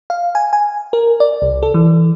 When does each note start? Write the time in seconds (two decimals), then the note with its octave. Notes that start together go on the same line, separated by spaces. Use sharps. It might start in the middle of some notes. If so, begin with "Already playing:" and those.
0.10 F5
0.35 G#5
0.53 G#5
0.93 A#4
1.20 D5
1.42 C2
1.63 A4
1.74 E3